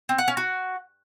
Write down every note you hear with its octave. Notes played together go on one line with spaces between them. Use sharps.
C4
F#5
C#4
F#4